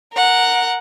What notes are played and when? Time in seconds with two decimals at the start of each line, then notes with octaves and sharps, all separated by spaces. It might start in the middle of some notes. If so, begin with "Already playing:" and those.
0.13 A#4 F#5